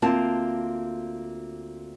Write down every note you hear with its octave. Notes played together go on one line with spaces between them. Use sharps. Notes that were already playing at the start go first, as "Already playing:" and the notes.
D2 A#3 C4 F4 A5